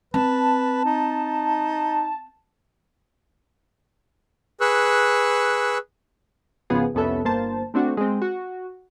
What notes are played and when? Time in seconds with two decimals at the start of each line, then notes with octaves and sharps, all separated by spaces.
0.14 C4 B4 A5
0.85 D#4
4.61 G#4 B4 C#6 E6 F#6
6.70 G#1 C#3 F3 B3 G#4
6.94 C2 F2 B3 C#4 A4 E5
7.25 G1 A#3 C5 A5
7.74 A3 C4 D4 F#4
7.97 G#3 C4
8.22 F#4